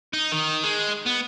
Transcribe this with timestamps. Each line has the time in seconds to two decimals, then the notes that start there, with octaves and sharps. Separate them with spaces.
0.13 D#4
0.32 D#3
0.64 G#3
1.06 B3